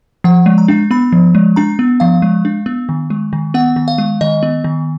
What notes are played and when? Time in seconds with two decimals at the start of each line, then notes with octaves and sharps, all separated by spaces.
0.24 F3 F#5
0.46 G#3
0.58 A#5
0.68 D4
0.91 B3 B5
1.12 F3
1.35 G#3
1.56 D4 A#5
1.79 B3
2.00 F3 F5
2.22 G#3
2.45 D4
2.66 B3
2.89 D#3
3.10 G#3
3.33 D#3
3.54 B3 F#5
3.76 D#3
3.88 F5
3.98 G#3
4.21 D#3 D#5
4.43 B3
4.64 D#3